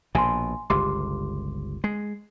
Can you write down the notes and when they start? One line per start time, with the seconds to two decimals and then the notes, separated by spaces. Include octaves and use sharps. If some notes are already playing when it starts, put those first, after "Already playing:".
0.15 A#1 B2 G#5 C6
0.70 G1 C#2 G4 C6 D6
1.84 G#3 C7